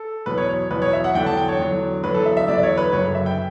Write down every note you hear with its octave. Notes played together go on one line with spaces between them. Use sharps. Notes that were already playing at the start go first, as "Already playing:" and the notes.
Already playing: A4
E2 B2 F#3 B4
C#5
C#5
E2 B2 F#3 B4
C#5
E5
F#5
E2 D3 F#3 G5
A5
G5
C#5
E2 D3 F#3
E2 D3 F#3 B4
A4
E5
E5
E2 D3 F#3 D5
D5
C#5
B4
F#1 F#2 D3 F#3 C#5
E5
G5